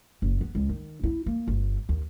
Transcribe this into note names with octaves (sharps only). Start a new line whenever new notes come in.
F#1
B3
C#2
D#3
E4
A#3
G1
D#2